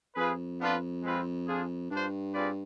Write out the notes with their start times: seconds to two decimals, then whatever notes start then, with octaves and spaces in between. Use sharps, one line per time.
0.16 F2 F4 G#4 B4
0.60 B3 D4 F4 B4
1.03 G#3 C4 F4 B4
1.47 D4 F4 G#4
1.90 G2 D4 F4 C5
2.34 C4 F4 G#4 B4 D5